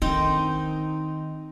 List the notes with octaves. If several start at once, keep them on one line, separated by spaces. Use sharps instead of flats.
D#3 C4 D4 D#4